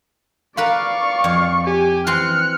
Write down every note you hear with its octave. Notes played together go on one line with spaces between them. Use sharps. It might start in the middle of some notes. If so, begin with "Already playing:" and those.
A#4 B4 D5 F5 B5 C#6
F2
G4 G#5
E3 C4 C6 F6 F#6 C#7